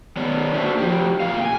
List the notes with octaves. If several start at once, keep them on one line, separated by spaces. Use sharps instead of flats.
D#3 B3 C#5 D5
A3 A#3 D4 F#4 C5 E5
F3 G4
A#2 E3 A3 F5
G5 G#5